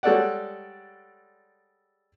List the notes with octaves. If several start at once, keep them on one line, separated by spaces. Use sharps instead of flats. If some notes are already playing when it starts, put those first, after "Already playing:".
G3 G#3 A4 C#5 D5 F#5